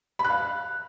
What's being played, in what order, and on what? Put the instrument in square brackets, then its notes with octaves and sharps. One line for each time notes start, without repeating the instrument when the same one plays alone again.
[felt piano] B5
F#6
F5